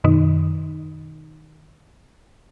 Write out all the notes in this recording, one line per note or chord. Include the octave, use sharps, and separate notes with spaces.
F#2 B2 D#3 D#4